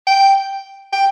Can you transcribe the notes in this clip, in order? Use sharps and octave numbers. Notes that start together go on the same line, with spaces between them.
G5
G5